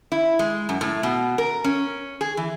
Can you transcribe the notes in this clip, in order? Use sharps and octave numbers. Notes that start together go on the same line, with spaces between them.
E4
G#3
F#2
A2
B2
A#4
C#4
G#4
E3